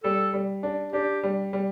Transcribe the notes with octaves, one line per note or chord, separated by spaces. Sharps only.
G3 A4
G3
D4
D4 G4
G3
G3